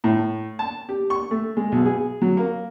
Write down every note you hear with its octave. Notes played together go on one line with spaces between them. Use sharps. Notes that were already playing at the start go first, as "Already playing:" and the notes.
A2
A5
G4
C#6
A3
G#3
B1
G#4
F#3
A#3